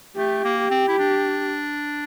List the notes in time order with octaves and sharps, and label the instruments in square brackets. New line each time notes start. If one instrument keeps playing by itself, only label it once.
[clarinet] A3 [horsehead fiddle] G4
[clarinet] A#3
[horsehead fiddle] G4
[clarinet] C4
E4
D4